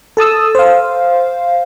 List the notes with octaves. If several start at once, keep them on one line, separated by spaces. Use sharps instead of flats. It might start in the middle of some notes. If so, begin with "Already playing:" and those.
A4 A5 D#6 E6
C5 F5